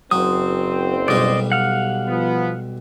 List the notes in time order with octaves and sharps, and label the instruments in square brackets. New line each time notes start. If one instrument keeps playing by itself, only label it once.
[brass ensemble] F#1 C4 C5 [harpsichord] F#3 [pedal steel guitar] D#6
[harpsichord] B1 G3 [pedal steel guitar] D5 D#5
[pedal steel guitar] F5 F#5
[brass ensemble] F3 B3